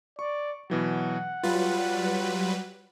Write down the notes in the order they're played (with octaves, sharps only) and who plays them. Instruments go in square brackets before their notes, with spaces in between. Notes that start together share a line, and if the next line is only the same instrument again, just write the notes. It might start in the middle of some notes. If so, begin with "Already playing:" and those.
[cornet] D5 [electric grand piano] C#6
[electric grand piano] B2 E3 F#3 [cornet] F#5
[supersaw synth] F#3 G3 B4 [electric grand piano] F4